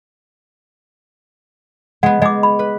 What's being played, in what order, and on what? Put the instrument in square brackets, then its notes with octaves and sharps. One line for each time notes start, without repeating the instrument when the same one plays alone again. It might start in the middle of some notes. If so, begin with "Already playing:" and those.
[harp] G#3 B3 [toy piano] F#5
[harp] G#3 [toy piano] D#5 D6
[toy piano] B5
[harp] B4